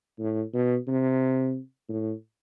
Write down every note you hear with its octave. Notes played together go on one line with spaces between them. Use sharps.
A2
B2
C3
A2